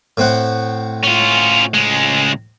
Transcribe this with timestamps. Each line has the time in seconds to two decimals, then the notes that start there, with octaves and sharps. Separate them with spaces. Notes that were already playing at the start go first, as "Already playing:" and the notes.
0.17 A2 C4 F#5
1.04 C#4 F4
1.74 C#2 G#3